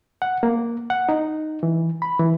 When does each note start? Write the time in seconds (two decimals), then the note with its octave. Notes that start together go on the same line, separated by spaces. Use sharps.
0.22 F#5
0.43 A#3
0.90 F#5
1.09 D#4
1.63 E3
2.02 B5
2.19 E3